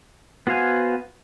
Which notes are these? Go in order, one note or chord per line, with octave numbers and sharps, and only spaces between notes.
B3 F#4 C5 F5 G#5